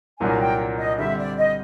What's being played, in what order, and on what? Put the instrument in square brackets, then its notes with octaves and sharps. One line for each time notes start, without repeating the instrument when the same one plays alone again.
[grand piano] C2 A#2 F#3 A#3 D4 [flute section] G#5
[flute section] G5
D#5
[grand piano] D3 G3 C4 [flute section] E5
[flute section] D5
D#5